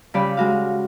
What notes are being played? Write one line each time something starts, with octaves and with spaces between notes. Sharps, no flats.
C#3 G3 F4 D5 B5
G#3 F#4 F5